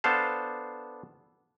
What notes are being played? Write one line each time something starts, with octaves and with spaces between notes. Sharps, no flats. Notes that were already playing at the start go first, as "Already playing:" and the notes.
B3 D4 A4 C5 F5 A5